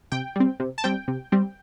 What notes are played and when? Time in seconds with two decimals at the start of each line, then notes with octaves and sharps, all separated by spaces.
0.12 C3 G5
0.36 G3 C4
0.60 C3
0.78 A5
0.84 G3 C4 G5
1.08 C3
1.32 G3 C4